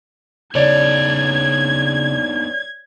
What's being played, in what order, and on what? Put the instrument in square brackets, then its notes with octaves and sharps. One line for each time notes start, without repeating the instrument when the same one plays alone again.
[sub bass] C#3 [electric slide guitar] B3 D4 D#4 [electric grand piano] C#5 D5 [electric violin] G#6